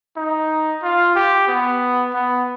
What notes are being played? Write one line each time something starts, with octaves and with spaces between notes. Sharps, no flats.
D#4
F4
G4
B3
B3